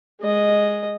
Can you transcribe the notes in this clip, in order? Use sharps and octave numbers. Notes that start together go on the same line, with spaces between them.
G#3 D#5